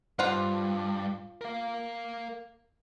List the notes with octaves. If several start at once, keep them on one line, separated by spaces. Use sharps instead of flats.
G2 F4 C5 F#5
A#4 F5